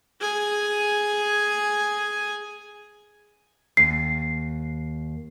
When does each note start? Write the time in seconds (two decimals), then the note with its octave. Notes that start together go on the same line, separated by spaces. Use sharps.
0.20 G#4 G#5
3.77 D#2 C7